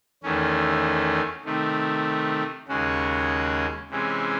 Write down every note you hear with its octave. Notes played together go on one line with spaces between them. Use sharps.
E2 D#3 A3 C#4
C3 D#3 A3
D#2 C#3 G#3 C#4 F#4
C3 E3 G#3 C#4